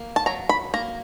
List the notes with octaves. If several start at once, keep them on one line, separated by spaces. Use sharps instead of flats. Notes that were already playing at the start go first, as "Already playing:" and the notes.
Already playing: A#3
A5
F#3 A#5
B5
A#3 A#5